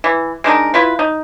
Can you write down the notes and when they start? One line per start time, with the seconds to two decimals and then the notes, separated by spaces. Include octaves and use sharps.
0.04 E3
0.44 G#3 D4 D#4 A#4
0.74 E4 F4 B4
0.99 D#4